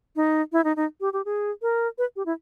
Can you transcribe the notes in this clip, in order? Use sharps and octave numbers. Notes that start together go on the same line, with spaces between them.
D#4
E4
D#4
D#4
G4
G4
G#4
A#4
B4
G4
E4